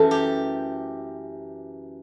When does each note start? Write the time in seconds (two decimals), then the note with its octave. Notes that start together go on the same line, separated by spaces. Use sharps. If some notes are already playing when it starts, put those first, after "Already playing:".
Already playing: F#2 E3 A3 A4
0.11 G4